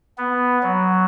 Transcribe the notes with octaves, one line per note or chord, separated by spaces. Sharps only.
B3
F#3